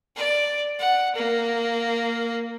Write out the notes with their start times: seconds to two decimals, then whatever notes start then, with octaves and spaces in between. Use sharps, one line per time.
0.16 D5
0.80 F#5
1.16 A#3